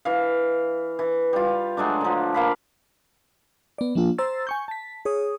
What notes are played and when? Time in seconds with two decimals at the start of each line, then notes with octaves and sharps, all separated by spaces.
0.05 E3 F5
0.99 E3
1.33 G3 F4
1.77 F#3 G#3 A3 D4
2.01 D3 F3
2.34 A#3 F5 B5
3.78 B3 D5
3.95 F3 A#3 D4 F4
4.18 C5 A#5 C6 E6 A6
4.47 G#5 C#6 G6
4.68 A5 B6
5.05 G#4 C#5 D#6